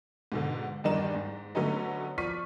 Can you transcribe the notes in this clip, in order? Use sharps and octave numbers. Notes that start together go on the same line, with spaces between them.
G#2 B2 D3
E2 G2 D#3 D4 D#4 E7
G#2
D3 F#3 A3 B3 C#4 D#4
F3 D5 C#6 F6 B6 D#7